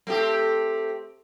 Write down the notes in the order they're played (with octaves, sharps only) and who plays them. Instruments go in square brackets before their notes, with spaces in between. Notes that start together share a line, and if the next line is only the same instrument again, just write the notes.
[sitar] A3 C4 G4